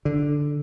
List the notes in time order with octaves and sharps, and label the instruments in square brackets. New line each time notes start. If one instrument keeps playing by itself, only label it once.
[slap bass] D3